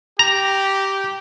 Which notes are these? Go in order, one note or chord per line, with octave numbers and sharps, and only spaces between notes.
G4 A#5